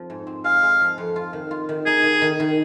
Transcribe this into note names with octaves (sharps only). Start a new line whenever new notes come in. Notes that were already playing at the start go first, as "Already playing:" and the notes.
Already playing: F2 F3
G#2
C4
G#3 F5
G#3
F3
F2
F4
D#3
F4
D#3
D#4 G#4
D#3
D#3
D#3